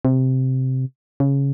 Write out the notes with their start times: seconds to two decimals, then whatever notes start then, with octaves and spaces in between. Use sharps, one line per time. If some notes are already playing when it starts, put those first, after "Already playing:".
0.05 C3
1.20 C#3